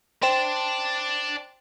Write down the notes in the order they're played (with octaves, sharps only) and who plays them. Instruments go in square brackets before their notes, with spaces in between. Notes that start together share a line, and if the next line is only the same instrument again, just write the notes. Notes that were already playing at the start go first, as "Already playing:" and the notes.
[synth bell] C5 G5 C6 [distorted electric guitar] D5 A5